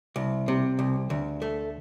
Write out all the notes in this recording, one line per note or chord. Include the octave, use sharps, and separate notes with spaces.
C2
C3
C2
D2
A3